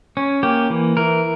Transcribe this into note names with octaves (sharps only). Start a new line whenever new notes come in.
C#4
A#3 G4
E3
E3 A#4